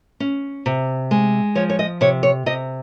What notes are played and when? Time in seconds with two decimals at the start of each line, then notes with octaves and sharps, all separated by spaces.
0.20 C#4
0.66 C3
1.11 G#3
1.55 F3 C#5
1.69 C#5
1.79 D#5
2.01 C3 C#5
2.23 C#5
2.46 C3 D#5